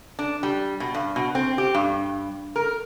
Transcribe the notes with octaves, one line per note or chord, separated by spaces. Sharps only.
D4
G3
B2
G2
B2
C4
G4
G2
A#4